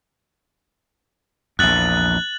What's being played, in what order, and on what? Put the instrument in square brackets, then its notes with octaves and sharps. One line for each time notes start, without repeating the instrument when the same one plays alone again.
[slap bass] A#1 E2 [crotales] F#6 A6 F#7